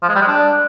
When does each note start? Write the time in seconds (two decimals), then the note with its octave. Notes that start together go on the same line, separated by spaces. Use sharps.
0.03 F3
0.09 G#3
0.15 G3
0.21 G#3
0.28 D4